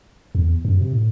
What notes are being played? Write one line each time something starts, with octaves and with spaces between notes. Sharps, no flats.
E2
F#2
C3
A2